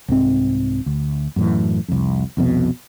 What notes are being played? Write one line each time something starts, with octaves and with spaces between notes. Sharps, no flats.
C2 G#2 C4
D2
F#2 A2 E3
C2 F2
C2 F2 B2